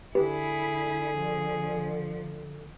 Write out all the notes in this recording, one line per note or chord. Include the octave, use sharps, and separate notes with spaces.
D3 E4 G4 G#4 B4
F3